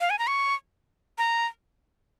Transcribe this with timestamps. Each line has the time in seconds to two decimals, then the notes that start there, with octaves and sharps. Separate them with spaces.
0.01 F5
0.10 G#5
0.19 A#5
0.27 C#6
1.18 A#5